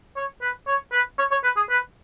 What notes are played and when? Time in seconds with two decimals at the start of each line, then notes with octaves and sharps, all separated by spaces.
0.17 C#5
0.42 B4
0.67 C#5
0.93 B4
1.19 C#5
1.31 C#5
1.44 B4
1.57 G#4
1.70 B4